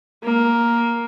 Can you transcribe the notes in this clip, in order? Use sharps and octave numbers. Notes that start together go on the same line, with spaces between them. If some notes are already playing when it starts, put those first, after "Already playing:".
A#3